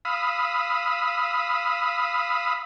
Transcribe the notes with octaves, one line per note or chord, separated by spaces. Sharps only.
F5 B5 D#6 E6